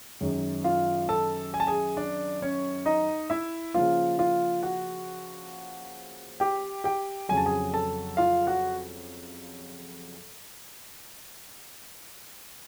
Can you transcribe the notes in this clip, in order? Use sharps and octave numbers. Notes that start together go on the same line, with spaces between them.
F#2 D#3 G#3 C#4
F4 F5
A4 A5
G#5
A5
G#4 G#5
D4 D5
C#4 C#5
D#4 D#5
E4 E5
C#3 F3 A#3 F4 F5
F4 F5
F#4 F#5
G4 G5
G4 G5
F2 C#3 F#3 G#5
A5
G#4 G#5
A4 A5
F4 F5
F#4 F#5